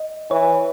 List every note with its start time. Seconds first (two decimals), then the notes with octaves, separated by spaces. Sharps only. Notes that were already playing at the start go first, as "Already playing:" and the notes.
Already playing: D#5
0.31 E3 C#5